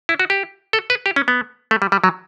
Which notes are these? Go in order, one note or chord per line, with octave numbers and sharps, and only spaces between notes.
E4
F#4
G4
A4
B4
G4
C#4
B3
A3
G3
G3
F#3